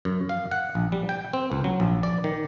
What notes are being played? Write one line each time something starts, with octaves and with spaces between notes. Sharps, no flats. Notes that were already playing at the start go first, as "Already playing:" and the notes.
F#2
F5
F#5
A#1
G3
G5
C4
C#2
F#3
A#1
D5
D#3